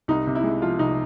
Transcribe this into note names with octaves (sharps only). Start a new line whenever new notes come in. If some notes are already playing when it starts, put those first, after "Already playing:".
C2 D#4
C3
E4
G#3
F3 F4
C2 D#4